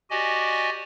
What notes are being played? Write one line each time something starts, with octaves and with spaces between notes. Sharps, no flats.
F#4 G4 D5 D#5 G#5